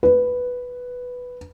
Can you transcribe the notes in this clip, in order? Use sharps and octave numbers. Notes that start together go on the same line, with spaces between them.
B4